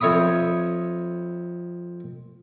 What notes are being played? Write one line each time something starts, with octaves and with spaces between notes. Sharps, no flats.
F2 C#5 E5 B5 D#6